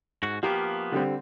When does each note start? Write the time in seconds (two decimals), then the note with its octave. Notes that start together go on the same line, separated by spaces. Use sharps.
0.23 G#2 F#4
0.43 F3 A#3 B3 G4
0.92 D3 G3 C4